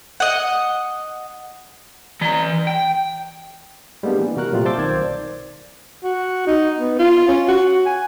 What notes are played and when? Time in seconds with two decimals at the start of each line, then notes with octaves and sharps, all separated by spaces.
0.20 D#5 F#5
2.21 E3 A#5
2.67 G5
4.03 G3 G#3 A#3 B3 D4
4.18 E3
4.36 C3 F#4 A#4 F#6
4.52 A#2 F#3 G3 A3 C4 F4
4.65 C5 F5 A5 C6 D6 E6
4.78 B1 D#3 C5 D5 G#6
6.03 F#4
6.47 D#4
6.78 B3
6.99 F4
7.28 C#4
7.48 F#4
7.86 G#5